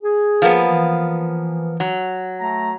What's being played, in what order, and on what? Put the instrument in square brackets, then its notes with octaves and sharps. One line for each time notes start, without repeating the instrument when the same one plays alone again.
[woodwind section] G#4
[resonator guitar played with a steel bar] F3 A#3 B3
[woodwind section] E3
[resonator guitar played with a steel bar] F#3
[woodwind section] A3 A#5